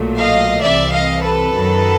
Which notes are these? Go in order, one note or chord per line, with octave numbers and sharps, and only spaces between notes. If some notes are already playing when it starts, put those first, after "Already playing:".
Already playing: B1 A#2 F#3 A3
D#5 F5
C2 C3 E3 D5 E5
D#5 F5
A4 B4
F#2 D#3 F#3